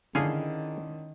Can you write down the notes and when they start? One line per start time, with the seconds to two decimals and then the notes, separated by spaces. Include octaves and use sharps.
0.15 D3 D#3 C#4 E4 G#4 D#5 F5 G#5